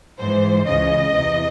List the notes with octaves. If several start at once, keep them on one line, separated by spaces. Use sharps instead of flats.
G#2 E3 C5
C#2 C#3 E3 D#5
E2 C3 E3